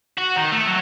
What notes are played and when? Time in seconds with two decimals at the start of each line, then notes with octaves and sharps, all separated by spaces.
0.18 F#4
0.36 D#3
0.52 A3
0.67 F#3